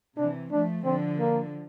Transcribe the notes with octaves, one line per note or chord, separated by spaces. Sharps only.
C3 E3 D4
F3 A3 D4
D3 F3 C4
A#3